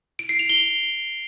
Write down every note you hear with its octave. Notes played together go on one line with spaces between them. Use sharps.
D7
C7
F7
G7
G7